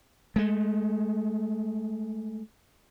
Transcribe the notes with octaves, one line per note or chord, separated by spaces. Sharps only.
G#3 A3